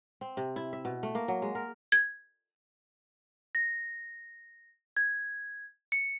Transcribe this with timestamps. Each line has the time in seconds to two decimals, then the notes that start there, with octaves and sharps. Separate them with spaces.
0.21 C4
0.37 C3
0.56 E4
0.73 E5
0.85 B2
1.03 A3
1.15 A#3
1.28 F#3
1.42 G#3
1.55 A#4
1.92 G#6
3.55 A#6
4.97 G#6
5.92 C#7